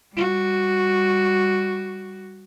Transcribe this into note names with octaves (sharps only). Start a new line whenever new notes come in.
G3 F#4